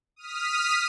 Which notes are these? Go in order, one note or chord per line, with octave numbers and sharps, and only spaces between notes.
D#6 F6 B6